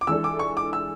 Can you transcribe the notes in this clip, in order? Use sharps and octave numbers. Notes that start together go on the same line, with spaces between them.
D6
E3 G#3 D4 A4 E6
D6
C#6
D6
E6